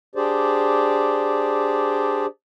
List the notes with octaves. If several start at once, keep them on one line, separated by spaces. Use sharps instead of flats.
D4 G4 G#4 C5 D5